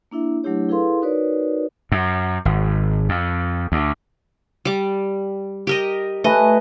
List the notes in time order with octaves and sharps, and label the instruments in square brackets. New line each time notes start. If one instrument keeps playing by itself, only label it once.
[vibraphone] A#3 D4 E4 E5
F#3 A3 D4 E4 G4 C#5
E4 G#4 A4 B4 F5 C6
D#4 F#4 A#4 B4 C#5 D5
[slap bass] F#2
G#1
F2
D2
[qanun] G3 D6
G4 A#4 D#5
[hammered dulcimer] A3 B4 G#5 [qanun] D#5